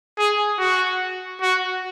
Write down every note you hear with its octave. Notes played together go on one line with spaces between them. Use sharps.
G#4
F#4
F#4